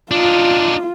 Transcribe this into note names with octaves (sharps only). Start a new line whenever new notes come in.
D4 D#4 F4